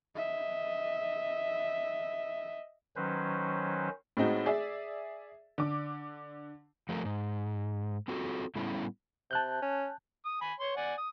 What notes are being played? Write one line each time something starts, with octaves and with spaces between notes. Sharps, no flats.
D#5 E5
D#3 F#3 C#4 B4 C5
A2 G#3 C4 D#4 F#4
G#4 D5 E5
D3 D6
F3 A3 A4 A#4
G#2
C4 F4 F#4 A4
A2 G3 A3 B3 C#4 E4
C3 A5 F#6 G6
C#4
D#6
G#5 B5
C#5 C6
D5 F#5 G#5
D#6